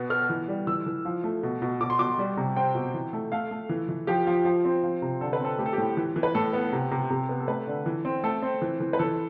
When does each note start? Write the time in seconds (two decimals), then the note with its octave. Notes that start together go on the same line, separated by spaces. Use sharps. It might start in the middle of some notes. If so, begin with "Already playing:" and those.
Already playing: B2 B3
0.10 B3 F6
0.30 E3
0.48 G3
0.67 E3 E6
0.86 E3
1.05 F3
1.24 A3
1.43 B2
1.62 B2
1.81 B2 D6
1.90 C6
1.99 B2 D6
2.19 G3
2.37 C3
2.56 C4 G5
2.75 B2
2.94 E3
3.13 A3
3.32 A3 F5
3.51 A3
3.69 E3
3.89 E3
4.07 F3 G4
4.27 F3
4.45 F3
4.65 C4
4.83 F3
5.02 C3
5.21 D3 A4
5.33 B4
5.40 C4 A4
5.59 A3 G4
5.66 A4
5.73 A2 G4
5.97 E3
6.16 E3
6.23 B4
6.35 A2 A4
6.53 B3
6.73 C3
6.91 C3
7.10 C3
7.29 B3
7.40 A4
7.48 A3 B4
7.67 D3
7.86 E3
8.05 C4
8.24 A3 A4
8.42 C4
8.62 E3
8.80 E3
8.93 B4
8.99 E3 A4